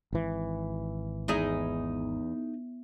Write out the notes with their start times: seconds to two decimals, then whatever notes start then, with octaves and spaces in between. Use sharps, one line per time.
0.13 G#1 E3
1.28 E2 D#4 E4 G#4